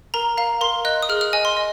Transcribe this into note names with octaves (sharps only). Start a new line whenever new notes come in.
A#4 A#5
F5 A#5
A#4 C6
D#5 F#6
D#6
G#4 F6
F6
D#5 G#5
C6
D#5